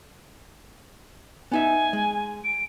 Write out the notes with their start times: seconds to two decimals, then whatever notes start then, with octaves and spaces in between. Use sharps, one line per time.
1.52 B3 D#4 E5 G#5
1.93 G#3
2.44 D7